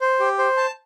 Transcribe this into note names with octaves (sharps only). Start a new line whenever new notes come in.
C5
G4
C5
A5